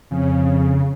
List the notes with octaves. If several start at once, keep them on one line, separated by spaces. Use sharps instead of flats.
F2 C#3